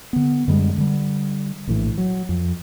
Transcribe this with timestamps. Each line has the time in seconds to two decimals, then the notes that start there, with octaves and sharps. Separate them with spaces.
0.13 D3 B3
0.48 F#2 D3 G3 G#3
0.78 D3 G3
1.67 A#1 A2 E3
1.98 F#3
2.29 F2